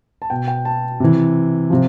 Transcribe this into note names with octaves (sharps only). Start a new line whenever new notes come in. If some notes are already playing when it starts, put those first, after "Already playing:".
A5
B2 G5
G5
A5
C3 E3
C3 F3